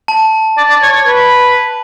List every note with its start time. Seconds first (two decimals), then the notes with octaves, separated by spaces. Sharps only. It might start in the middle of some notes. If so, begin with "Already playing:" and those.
0.08 A5
0.58 D5
0.70 D5
0.83 C#5
0.95 C#5
1.07 B4